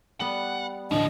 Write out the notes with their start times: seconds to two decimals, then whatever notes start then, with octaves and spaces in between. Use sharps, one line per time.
0.20 G3 B3 F#5 F#7
0.91 A1 D2 B2 D3 F3 D#5